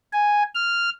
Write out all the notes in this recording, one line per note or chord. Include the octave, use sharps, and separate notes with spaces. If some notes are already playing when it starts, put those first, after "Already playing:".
G#5
F6